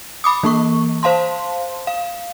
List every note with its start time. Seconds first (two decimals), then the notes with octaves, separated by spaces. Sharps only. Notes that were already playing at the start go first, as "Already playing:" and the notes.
0.24 B5 D6 D#6
0.43 E3 A#3 C#6
1.03 C5 F5 A5 C6
1.87 F5